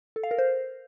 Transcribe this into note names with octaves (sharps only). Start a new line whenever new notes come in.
A4
F5
A#4
C5